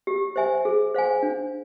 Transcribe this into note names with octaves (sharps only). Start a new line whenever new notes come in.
G4
C5 E5 G#5
G#4
C5 F5 G#5
D4